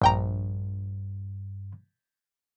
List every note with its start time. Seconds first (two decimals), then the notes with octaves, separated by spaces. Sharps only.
0.02 A#1 G2 G5 A#5